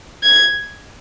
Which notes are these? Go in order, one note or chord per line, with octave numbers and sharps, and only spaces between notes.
G#6